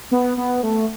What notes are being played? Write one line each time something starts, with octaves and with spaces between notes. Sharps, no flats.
B3
B3
A3